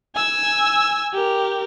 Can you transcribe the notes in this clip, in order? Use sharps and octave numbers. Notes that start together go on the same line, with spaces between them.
G#5 E6
G4 A#4